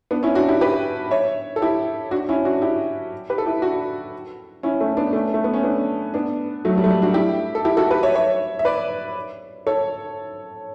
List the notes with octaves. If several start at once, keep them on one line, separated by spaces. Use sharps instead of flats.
B3 D4
C#4 E4
D4 F#4
E4 G4
G4 B4
C#5 E5
A4
E4 G4
D4 F#4
C#4 E4
D4 F#4
E4 G4
G4 B4
A4
E4 G4
D4 F#4
C#4 E4
A3 C#4
B3 D4
A3 C#4
A3
B3
C#4
B3 D4
B3 D4
F#3 A3
G3
A3
G3
D4 F#4
E4 G4
A4
E4 G4
F#4 A4
G4 B4
C#5 E5
C#5 E5
E5
B4 D5
A4 C#5